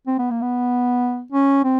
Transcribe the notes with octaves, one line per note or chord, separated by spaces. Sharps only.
C4
B3
A#3
B3
C#4
C4